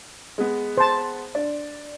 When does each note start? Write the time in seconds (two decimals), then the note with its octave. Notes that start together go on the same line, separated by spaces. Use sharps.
0.38 G#3 B3
0.77 C5 A5
1.35 D4